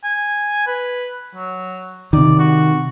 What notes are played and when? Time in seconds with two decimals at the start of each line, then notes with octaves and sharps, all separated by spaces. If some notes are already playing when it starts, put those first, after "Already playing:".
0.04 G#5
0.67 B4
1.35 F#3
2.13 C3 D#3 D5
2.39 F#4